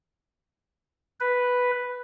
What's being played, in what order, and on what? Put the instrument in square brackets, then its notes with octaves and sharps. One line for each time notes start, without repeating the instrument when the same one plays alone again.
[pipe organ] B4